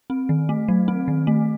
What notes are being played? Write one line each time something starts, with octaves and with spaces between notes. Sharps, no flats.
C4
D#3
A3
F#3
C4
D#3
A3